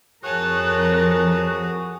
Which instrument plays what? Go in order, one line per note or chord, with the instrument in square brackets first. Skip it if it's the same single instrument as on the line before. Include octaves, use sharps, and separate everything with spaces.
[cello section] F2 A#4 [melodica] F#4 G#4 D#6 [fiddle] C#5 A5 [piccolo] F#6